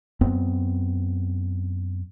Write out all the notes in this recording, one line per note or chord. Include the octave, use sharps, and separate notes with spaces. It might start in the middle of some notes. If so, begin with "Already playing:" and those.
F#2 B3 C4